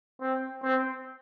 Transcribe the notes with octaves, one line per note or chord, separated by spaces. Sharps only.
C4
C4